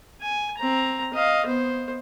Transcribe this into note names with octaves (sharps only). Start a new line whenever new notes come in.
G#5
C4 A#5
D#5 F5
B3 C5